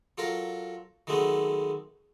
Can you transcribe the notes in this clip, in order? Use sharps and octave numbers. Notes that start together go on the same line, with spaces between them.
F#3 F4 A4 A#4
D#3 F#3 G#3 A3 B3 C4